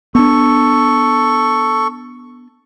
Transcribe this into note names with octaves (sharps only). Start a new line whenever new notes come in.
B3 D4 A4 C#6